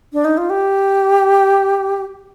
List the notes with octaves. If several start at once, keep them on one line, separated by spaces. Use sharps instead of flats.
D4
D#4
F4
G4